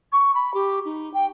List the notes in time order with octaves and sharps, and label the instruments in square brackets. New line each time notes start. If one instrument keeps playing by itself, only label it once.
[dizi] C#6
B5
G4
D#4
G5